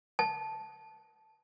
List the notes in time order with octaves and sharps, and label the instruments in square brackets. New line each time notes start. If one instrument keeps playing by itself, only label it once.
[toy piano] A5